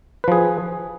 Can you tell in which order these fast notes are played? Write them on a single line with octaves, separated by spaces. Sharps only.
B4 F3 G#4